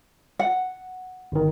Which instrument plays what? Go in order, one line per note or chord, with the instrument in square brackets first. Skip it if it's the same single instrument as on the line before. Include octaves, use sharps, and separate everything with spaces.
[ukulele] F#5
[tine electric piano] G1 D#3